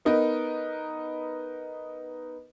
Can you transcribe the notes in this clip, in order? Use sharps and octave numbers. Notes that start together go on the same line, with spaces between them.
B3 D#4 A#4 B4